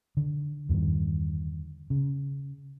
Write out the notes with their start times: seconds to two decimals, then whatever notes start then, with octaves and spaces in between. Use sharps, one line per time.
0.17 D3
0.69 E2 G2 D3 D#3
1.90 C#3